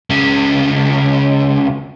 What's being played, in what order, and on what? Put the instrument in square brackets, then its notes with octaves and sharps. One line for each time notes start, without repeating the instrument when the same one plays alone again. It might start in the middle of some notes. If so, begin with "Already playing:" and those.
[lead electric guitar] C#2 C#3